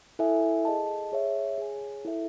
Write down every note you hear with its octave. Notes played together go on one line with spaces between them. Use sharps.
E4 A4 E5 G#5
G#4 D#5 A5
G#4 C#5 E5
G#4 C#5 G#5
E4 A4 E5